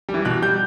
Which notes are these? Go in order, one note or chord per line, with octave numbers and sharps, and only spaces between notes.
G3
E3
B2 F#6
G3 G6